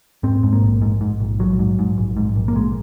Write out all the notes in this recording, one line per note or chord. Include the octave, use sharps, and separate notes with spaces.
G#2 C4
G#2
A#3
A#1
G#2
G#2
A#1
A#1 F#3
G#2
G#2
A#1
G#2
A#1
A#3
A#1 G#3